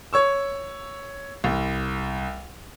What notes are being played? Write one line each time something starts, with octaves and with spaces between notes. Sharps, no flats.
C#5 C#6 E6
C2